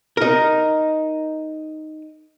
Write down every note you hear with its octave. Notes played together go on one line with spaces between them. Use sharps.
D#4 A#4